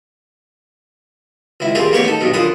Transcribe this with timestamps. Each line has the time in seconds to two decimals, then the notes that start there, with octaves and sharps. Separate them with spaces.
1.60 C#2 E4
1.75 G3 A#3 C4 F4 G4 G#4
1.92 A1 A#3 B3 G4 C#5 C#6
2.04 D#4 A4
2.21 B1 G2 B2
2.33 F#2 D3 F4 B4 D#6